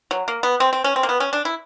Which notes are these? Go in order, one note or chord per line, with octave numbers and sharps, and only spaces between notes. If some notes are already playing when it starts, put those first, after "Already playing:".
F#3
A#3
B3
C4
C4
C#4
C4
A#3
B3
C#4
D4
E4